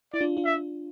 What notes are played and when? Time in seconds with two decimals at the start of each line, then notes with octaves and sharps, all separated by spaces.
0.13 E4 D5
0.21 D4 F4
0.37 D4 F4
0.45 E5